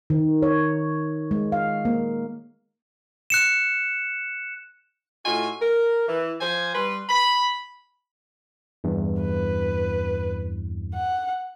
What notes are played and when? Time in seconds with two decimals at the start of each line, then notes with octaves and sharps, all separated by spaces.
0.10 D#3
0.42 C#5
1.31 G#3
1.52 F5
1.85 A#3
3.30 F#6 C#7 E7
5.26 A2 A3 D#4 F4 F#4 G#5
5.62 A#4
6.08 E3
6.41 F3 C5 G#5
6.75 G3 B4 C6
7.10 B5
8.84 E2 G2
9.21 B4
10.94 F#5